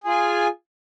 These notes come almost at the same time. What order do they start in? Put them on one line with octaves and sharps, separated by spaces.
G#4 F4 G#5